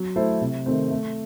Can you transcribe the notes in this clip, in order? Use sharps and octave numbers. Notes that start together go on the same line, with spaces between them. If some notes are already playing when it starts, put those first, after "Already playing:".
Already playing: F#3
A3 E4 A4 C5
C3
D#3 A3 C4
A3